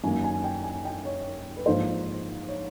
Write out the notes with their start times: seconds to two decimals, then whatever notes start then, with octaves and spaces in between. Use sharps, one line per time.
0.04 F#2 D#3 F#3 A#3 D#4 G#5
0.24 G#5
0.44 G5
0.64 G#5
0.85 G5
1.05 C#5
1.57 B4
1.66 G#2 F3 A#3 C5
2.48 C#5